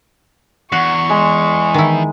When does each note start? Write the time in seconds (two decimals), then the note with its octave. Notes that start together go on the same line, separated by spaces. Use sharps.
0.72 E2 F#4 C#6
1.10 G#3
1.74 D#3 E4